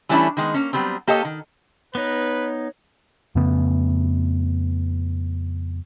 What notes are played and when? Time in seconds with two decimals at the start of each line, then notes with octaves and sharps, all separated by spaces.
0.09 E3 G3 A3 C#4 D4 E4
0.37 D#3 G#3 B3
0.54 A#3 C#4
0.73 F#3 G3 B3 C4
1.07 A#3 G4 A4 C#5 D#5
1.25 D#3
1.95 B3 D#4 B4 C#5
3.35 F2 C#3 A3 B3